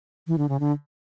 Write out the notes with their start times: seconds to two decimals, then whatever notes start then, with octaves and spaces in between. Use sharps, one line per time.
0.27 E3
0.38 D3
0.49 C#3
0.60 D3